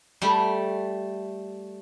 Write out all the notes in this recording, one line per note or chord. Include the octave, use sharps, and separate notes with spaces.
G3 A3